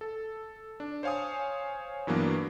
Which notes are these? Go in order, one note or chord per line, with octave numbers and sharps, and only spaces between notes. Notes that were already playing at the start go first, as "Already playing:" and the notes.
A4
D4
C5 C#5 F5 G#5 D#6
G2 E3 F#3 A#3 B3 D4